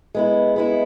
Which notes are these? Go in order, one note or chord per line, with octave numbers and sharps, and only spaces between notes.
G#3 B3 E4
G#3 B3 E4